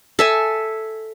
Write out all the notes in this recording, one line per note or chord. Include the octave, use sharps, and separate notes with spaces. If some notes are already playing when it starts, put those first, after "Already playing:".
A4 E5 G#5